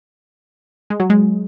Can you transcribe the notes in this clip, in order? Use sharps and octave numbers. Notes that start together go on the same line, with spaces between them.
G#3
F#3
G#3